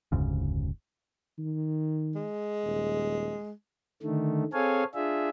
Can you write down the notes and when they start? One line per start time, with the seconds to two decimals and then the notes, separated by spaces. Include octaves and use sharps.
0.12 F1 D2 G#2 C#3
1.38 D#3
2.15 G#3
2.64 D#1
4.03 D3 D#3 A3
4.53 C4 G#4 A4 C#5 F5 G#5
4.95 D4 F4 G#4 E5